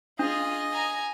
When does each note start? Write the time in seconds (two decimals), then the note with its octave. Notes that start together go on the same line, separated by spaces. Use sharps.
0.19 D4 F4 G#4 D#5
0.72 G#5 A#5